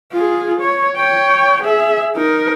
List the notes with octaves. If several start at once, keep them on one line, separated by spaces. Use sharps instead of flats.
F4 G#4
C#5
C#5 G5
G#4 E5
D#4 A#4